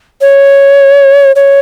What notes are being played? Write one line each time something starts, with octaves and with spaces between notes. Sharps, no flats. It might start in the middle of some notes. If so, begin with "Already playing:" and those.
C#5
C#5